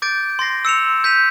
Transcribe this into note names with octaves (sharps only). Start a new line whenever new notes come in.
D6 G6 A6 D7
C6 A6 A#6 C7
E6 C#7 E7 F7
G6 B6 D#7 F7